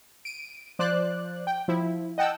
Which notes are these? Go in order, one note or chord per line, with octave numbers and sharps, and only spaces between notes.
D7 D#7
F3 C5 D5 F#6
G5
F3 E4
D#5 F#5 G5 A5 E6